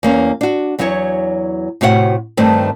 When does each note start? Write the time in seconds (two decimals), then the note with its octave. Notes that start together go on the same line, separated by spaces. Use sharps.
0.03 E2 A#3 C#4
0.41 D4 F#4
0.79 E2 F#3 E4 F#4 C#5
1.81 A2 C3 F#4 E5 F#5
2.37 G2 D#3 A3 C4